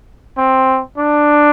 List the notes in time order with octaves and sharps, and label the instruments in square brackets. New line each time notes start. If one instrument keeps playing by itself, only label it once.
[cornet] C4
D4